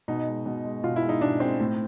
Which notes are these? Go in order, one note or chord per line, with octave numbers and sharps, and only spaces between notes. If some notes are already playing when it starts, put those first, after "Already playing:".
B2 D#4
G#3
B2
G#3
B2 F4
E4
G#3
D#4
B2 D4
G#3 C4
A2